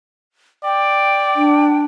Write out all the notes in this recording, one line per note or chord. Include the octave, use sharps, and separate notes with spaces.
D5 G5
D4